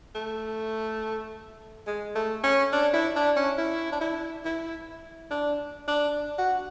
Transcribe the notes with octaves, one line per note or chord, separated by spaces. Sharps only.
A3
G#3
A3
C#4
D4
E4
D4
C#4
E4
D4
E4
E4
D4
D4
F#4